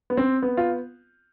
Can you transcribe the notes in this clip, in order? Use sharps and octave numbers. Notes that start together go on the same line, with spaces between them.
B3
C4
B3
F4